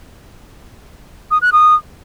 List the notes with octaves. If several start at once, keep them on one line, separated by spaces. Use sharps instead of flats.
D#6
F#6
D#6